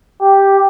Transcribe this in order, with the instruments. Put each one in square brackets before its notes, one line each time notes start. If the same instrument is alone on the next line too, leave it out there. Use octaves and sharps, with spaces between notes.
[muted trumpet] G4